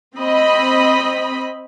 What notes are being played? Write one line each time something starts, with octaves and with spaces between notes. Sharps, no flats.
C4 D#5 B5